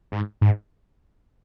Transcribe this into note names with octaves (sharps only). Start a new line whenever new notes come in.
G#2
G#2